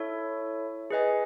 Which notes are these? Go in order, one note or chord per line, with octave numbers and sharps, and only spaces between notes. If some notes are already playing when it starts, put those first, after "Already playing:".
Already playing: E4 A4 C#5 E5
G#4 B4 D#5 G#5